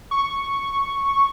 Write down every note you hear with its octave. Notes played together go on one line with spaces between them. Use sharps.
C#6